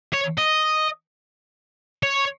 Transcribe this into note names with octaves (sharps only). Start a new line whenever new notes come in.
C#5
D#5
C#5